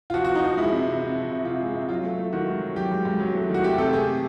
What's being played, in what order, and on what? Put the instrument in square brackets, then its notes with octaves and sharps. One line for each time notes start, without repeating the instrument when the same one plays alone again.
[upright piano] F4
F3 F#4
F#4
F3
D#4
F3
G#3 E4
C3
C3
C3
F3
C3
C3 F4
G#3
C3
F#3 F4
A3
A3
D#3 F#4
G#2
F#3
F#3 G4
G#2
G#2
F#3
A3
D#3
F#4
A3 G4
C3 A4
A3 G#4